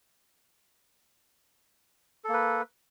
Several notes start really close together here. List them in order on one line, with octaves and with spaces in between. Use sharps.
A4 A#3 B4